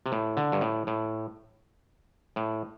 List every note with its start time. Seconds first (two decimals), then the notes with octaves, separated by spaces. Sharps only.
0.06 C3
0.12 A2
0.37 D3
0.52 G2
0.61 A2
0.87 A2
2.36 A2